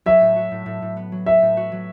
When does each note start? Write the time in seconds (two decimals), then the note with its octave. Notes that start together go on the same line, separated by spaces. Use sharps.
0.06 F#3 E5
0.21 A2
0.36 F#4
0.52 A2
0.66 A2
0.82 A2
0.97 B3
1.12 F#3
1.26 F#4 E5
1.42 A2
1.57 F#4
1.72 F#3